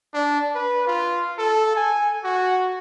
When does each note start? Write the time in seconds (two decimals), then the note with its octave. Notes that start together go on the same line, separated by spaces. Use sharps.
0.14 D4
0.55 B4
0.87 F4
1.38 A4
1.76 G#5
2.24 F#4